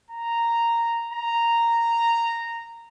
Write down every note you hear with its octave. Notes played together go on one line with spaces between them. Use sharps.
A#5
A#5